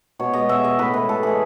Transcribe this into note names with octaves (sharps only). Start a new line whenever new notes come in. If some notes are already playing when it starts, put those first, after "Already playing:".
B2 C#5
G#3 D#5
B2 E5
G#3 D#5
A2 B4
E3 G#3 B4
A2 A4
E3 G#3 G#4